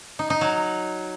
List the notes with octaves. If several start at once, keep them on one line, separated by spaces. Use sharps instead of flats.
D#4
D#4
F#3